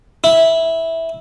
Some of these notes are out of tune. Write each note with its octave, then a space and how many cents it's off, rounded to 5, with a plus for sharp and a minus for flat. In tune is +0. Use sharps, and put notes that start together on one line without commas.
E4 -10